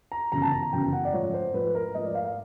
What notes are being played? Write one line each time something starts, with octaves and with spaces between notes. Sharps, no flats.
A#5
G1 F#2 C#3 E3 A#5
A5
A#5
A#5
G1 F#2 C#3 E3 G5
F#5
D5
G#2 F3 A3 C#5
C5
G#2 F3 A3 B4
A#4
G#2 F3 A3 D#5
D5
F5
F5